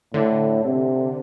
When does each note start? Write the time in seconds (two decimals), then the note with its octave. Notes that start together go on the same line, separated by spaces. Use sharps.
0.14 A2 D3
0.64 C3